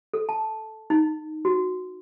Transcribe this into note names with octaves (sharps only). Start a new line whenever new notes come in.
A4
A5
D#4
F#4